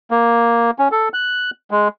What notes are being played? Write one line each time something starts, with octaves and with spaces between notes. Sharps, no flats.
A#3
C#4
A4
F#6
G#3